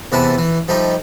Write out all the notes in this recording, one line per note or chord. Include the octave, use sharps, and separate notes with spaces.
E2 C3 E3 B4 A5
E3
F3 G3 A3 D#4